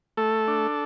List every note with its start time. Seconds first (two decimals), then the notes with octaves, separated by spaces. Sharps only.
0.17 A3 A4
0.48 D4